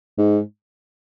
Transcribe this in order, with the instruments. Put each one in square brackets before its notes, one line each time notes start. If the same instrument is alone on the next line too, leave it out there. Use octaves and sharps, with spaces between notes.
[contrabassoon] G#2